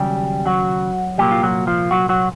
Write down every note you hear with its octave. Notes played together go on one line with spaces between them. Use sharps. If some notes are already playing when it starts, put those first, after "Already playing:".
Already playing: D#2 C#3 F#3 G3 G4
F#3 F#4
C2 A#2 F#3 G3 A#3 G4
F4
F#3 F#4
F3 F4
F#3 F#4
F#3 F#4